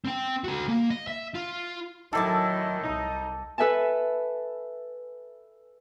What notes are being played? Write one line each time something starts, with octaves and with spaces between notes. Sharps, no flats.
C4 G5
F#4 A4
A#3
D#5
E5
F4
A2 D#3 F#3 E4 A4 G#5 A5 D6
C2 D#4
A4 B4 E5 G#5 A5